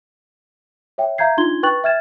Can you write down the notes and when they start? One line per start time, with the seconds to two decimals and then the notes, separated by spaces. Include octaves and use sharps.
0.98 C#5 E5 G5
1.18 E5 F5 A#5 G6 G#6 C7
1.37 D4 D#4 F4 C6 G#6 G7
1.63 B4 G5 C#6 F#6 A6 F#7
1.84 E5 G5 F6 G#6 A6 E7